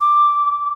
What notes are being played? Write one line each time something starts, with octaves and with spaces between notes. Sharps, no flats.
D6